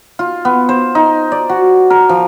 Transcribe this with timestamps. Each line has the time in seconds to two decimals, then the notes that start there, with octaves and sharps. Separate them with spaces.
0.19 F4
0.45 B3
0.69 C5
0.95 D#4
1.32 D5
1.49 F#4
1.90 A#4
2.09 F3